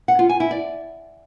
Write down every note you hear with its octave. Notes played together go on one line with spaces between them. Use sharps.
F#5
F4
G#5
E4
D5